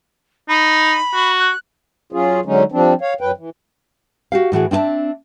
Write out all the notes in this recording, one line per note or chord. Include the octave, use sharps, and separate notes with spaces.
D#4 B5
F#4
F#6
F#3 C#4 F4 G#4
D3 F#3 G#3 C#4 D#4
F3 G3 C4 D4
C#5 F5
F#2 F#3 B4 G5
E3
F#4 G4 F5
A2 E3 F#4 G#4
C4 D4 E4 E5 A5